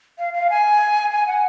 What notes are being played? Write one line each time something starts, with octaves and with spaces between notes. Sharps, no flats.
F5
F5
G#5
G#5
F#5